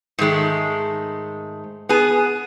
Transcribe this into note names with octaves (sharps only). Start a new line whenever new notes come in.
G#2 D#3 G#3 A3
B3 G#4